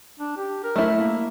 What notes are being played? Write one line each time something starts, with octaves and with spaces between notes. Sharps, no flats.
D4
G4
A#4
A3 E4
A#3